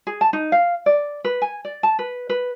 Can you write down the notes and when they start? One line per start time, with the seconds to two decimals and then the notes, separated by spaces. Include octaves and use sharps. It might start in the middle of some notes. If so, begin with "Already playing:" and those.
0.07 G#4
0.21 A5
0.33 D#4
0.52 F5
0.86 D5
1.25 B4
1.42 G#5
1.65 D5
1.83 A5
1.99 B4
2.29 B4